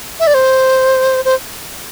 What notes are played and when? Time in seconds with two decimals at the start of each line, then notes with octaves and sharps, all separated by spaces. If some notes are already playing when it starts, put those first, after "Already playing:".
0.20 E5
0.27 D5
0.34 C5
1.25 C5